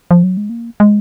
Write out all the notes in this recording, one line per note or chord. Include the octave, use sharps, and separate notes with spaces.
F3
F#3
G#3
A#3
G#3